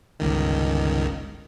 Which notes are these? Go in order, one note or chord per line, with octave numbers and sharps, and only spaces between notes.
G1 C#2 D#3